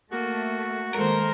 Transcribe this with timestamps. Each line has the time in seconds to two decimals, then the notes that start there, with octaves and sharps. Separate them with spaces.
0.12 A3 A#3 F#4
0.95 D#3 G#3 A#3 A4 A#4 C5